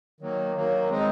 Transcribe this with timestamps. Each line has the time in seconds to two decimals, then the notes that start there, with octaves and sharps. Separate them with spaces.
0.21 D#3 F#3 A#3
0.55 D#3 F#3 A#3
0.90 G#3 C4 D#4